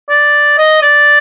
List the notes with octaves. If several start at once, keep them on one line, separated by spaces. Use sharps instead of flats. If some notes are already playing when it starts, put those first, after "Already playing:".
D5
D#5
D5